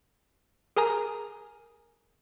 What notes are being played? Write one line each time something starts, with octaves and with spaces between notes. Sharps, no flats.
G#4 A#4 G#5 A#5 D#6